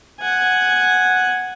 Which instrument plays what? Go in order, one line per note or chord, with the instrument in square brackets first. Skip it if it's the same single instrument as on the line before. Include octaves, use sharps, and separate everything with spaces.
[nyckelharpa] F#5 G#5